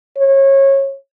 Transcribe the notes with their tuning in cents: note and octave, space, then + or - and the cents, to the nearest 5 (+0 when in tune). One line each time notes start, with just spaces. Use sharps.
C#5 -25